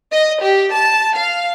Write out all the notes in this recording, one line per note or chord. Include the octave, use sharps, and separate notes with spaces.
D#5
G4
A5
F5